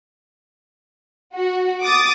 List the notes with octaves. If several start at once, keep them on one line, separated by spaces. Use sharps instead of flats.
F#4
D6 D#6 A6